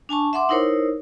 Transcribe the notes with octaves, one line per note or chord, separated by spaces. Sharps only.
D4 G#5 A5 C#6
E5 F#5 C6 D6
D#4 E4 A#4 C5 C#5